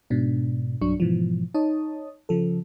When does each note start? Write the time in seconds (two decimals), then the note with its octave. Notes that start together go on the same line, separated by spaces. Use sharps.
0.10 G#2 B2 D4
0.81 B1 G2 F#3 D4 C#6
1.00 G#2 B2 E3 F3
1.54 D#4 C#5 A5 D#6
2.29 C#3 F3 A4